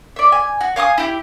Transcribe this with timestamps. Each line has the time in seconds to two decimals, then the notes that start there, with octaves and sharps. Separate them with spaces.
0.16 D5 E5
0.32 G#5
0.61 F#4
0.76 F5 G#5 C#6 D#6
0.98 E4 G4